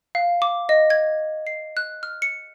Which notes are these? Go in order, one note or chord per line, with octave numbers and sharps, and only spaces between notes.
F5
D6
D#5
G#6
C7
F#6
F6
C#7